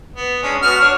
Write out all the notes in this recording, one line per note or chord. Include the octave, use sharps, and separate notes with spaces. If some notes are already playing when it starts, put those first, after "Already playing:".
B3
G#3 C#4 D4
B3 F#4 F6
D4 C#5